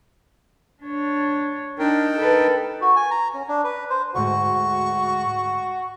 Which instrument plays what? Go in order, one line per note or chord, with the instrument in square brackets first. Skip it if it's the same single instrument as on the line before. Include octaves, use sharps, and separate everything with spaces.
[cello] D4 C#5
[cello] D4 [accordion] D#4 A#4 G5
[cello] A4 B4
[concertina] F#4
G#5
A#5
C#4
D4
B4
C5
[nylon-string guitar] D2 G#2 [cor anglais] F#4 [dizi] C#6